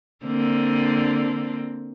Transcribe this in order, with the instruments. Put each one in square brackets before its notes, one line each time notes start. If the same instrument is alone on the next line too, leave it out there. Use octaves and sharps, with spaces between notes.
[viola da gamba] D3 A#3 C4